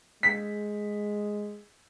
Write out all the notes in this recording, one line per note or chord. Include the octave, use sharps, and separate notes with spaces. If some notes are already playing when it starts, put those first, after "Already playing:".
G#3 B6